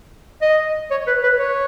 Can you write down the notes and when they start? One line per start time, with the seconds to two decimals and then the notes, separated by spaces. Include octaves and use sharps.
0.42 D#5
0.91 C#5
1.07 B4
1.23 B4
1.39 C#5